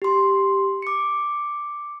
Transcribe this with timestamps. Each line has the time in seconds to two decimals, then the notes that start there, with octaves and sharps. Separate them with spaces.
0.02 G4 C6
0.82 D6 C#7